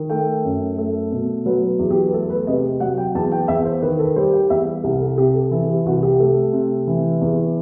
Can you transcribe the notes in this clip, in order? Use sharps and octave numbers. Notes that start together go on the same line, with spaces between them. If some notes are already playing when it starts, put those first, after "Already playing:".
Already playing: D#3
A3 G5
F#2
A3
B2
F#3 B4
E2
G4
B4
A3 A4
B4
C3 D#5
F#3 F#5
G5
E2 A5
G5
E2 E5
C5
D#3 B4
A4
G3 C5
G5
E2 E5
C2 G4
A4
C3 G4
A4
E3 A4
G4
C2 F#4
G4
A3
C3
E3
E2